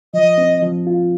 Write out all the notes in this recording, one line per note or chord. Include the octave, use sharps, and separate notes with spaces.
F3 D#5
C4
F3
F4